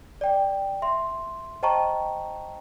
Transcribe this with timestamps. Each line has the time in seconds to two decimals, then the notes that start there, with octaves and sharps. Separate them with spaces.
0.21 D5 G5
0.82 E5 C6
1.63 C5 D#5 G5 A5 A#5 C#6